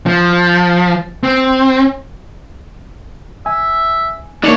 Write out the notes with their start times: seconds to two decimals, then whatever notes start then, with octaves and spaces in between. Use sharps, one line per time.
0.06 F3
1.23 C4
3.46 E5 G#5
4.44 A#3 D4 D#4 C#5